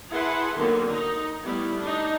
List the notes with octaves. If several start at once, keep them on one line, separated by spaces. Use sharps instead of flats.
E4 G#4 B4 F#5 A5 C6
D3 D#3 F#3 A#3 B3
D#4
G3 A3 B3 E4
D4 D#4